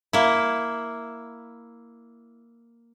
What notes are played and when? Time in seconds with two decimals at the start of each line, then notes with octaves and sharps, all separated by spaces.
0.13 A#3 E4